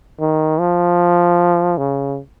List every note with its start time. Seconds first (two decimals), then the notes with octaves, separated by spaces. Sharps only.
0.20 D#3
0.60 F3
1.78 C#3